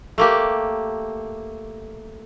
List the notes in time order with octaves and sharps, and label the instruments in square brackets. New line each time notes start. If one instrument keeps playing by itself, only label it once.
[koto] A3 A#3 G4